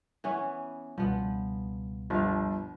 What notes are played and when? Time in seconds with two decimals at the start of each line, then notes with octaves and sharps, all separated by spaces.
0.24 E3 B3 C#4
0.98 C#2 B2 F3 G3 B3
2.10 G1 F3 F5